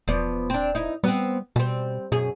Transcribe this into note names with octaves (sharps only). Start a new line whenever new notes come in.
E1 F3 B3 D5
C4 D4
D#4 E4
G3 B3 C4
B2 G3 C4
F#2 B2 C#4 G#4